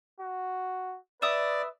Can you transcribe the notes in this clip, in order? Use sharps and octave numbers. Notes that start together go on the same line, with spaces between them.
F#4
B4 D5 E5 D#6